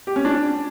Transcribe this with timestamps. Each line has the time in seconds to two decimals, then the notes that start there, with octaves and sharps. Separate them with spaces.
0.07 G4
0.16 C#4
0.25 D4